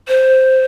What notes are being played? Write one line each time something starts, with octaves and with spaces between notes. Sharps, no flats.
C5